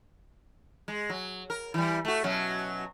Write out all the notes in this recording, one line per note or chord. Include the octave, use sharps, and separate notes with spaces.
G#3
F#3
A#4
E3 G3
A3 F#4
B2 F#3 C#4